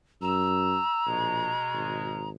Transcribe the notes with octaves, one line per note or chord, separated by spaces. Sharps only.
F#2 A#5 E6
A#1 B2 G#3
G#1